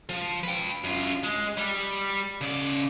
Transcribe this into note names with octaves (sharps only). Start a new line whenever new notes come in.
F3
B4 G5
F#2 F4
G#3
G3
C#3 D5